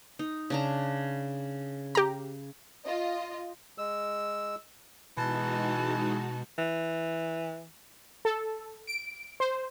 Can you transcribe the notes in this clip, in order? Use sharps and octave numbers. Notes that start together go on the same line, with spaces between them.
D#4
C#3 D4 A#5
G4 A#5
F4 D#5
G#3 E6
B2 E3 G#3 D#4 F#4 A5
E3
A4
D7
C5